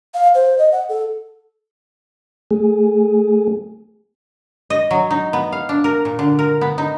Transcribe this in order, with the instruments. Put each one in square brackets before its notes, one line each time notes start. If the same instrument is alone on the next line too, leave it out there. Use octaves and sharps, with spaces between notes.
[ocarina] F5
C5
D#5
F#5
A4
[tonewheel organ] A3 G#4
[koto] D#5
F#3
D#4
B3
F5
D4
A#4
A#2
D3
A#4
B3
D#4